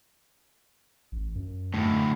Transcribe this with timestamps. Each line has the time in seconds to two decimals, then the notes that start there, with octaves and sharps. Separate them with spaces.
1.12 A1
1.35 F#2
1.74 D2 A2